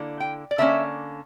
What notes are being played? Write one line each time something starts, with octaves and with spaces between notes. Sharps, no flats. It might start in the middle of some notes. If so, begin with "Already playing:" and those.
Already playing: D3 A#3 E4
G5
D5
D3 A#3 C#4 E5